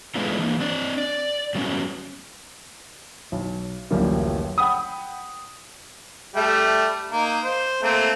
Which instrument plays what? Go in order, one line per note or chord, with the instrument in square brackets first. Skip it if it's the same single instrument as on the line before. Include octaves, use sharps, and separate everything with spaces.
[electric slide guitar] E3 G#3 A3 B3 D4 F4
E3 A#3
C4 D4 D5
D5
F#3 G3 A3 B3 C#4 F#4
[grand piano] B1
D1 A1 F#2 F3 G3 A#3
F#5 G5 B5 D#6
[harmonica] G3 A3 E5
A#3 D#4
C5
A3 A#3 C4